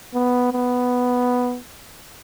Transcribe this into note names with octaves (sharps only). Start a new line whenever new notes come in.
B3
B3